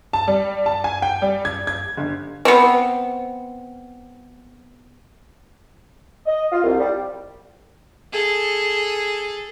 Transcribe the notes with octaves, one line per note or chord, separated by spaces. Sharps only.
A5
G3
A5
G#5
G5
G3
G#6
G#6
G1
B3 C4
D#5
F4
C2
G3
G#4 A4